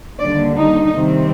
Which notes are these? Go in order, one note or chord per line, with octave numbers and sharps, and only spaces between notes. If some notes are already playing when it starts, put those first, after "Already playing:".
D#2 D3 G3 D4 D5
D#4
C3 D#3 G3 C4